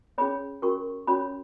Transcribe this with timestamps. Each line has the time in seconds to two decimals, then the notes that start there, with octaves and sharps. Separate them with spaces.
0.18 C#4 G#4 C#5 B5
0.62 C#4 F#4 A#4 C#6
1.07 C#4 F#4 C#5 B5